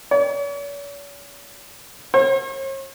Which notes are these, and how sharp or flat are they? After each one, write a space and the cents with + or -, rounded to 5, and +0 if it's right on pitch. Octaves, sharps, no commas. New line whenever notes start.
C#5 +45
C#5 -45